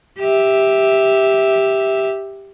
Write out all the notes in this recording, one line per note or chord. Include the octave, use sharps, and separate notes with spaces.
G4 E5